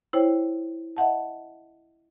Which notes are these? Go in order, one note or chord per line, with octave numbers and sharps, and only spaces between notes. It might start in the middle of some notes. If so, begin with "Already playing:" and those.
E4 C5 C#5 G5
D#5 E5 F#5 A5